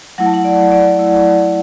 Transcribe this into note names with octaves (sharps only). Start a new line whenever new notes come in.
F#3 A3 E4 F#5
A5
F#5
D5
D5
F#3 A3 E4